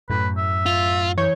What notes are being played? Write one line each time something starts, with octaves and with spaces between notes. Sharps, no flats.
F#2 A2 B4
E5
F4
E3 C#5 G6